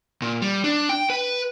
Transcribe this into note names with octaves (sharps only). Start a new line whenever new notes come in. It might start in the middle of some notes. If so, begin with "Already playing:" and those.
A#2
G3
D4
G5
B4